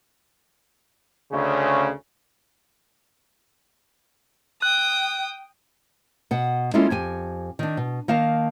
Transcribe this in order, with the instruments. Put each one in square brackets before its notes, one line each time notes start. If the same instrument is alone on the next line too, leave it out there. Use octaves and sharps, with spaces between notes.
[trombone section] D2 C#3
[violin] G5 D#6 [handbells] F#6
[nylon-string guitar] B2 F#5
G#3 A#3 C#4 E4 F4 A4
F2 G4 G#5
D#3 D4
B2
D#3 A#3 F5 A5